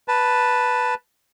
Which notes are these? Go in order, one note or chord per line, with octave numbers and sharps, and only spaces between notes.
B4 A5